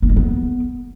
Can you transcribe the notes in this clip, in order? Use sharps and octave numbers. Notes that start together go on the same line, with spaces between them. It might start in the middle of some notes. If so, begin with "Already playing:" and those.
B3
G#3
B3